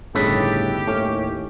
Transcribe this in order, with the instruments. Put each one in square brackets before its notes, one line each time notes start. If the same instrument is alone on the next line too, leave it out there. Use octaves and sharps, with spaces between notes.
[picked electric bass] G1 C#3 [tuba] A2 [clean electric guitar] D#4 A4 B4 [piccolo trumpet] G4
[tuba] D#2 [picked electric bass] A2 [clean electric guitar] C#4